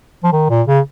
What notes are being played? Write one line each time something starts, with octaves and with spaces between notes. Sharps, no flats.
F3
D#3
A#2
C#3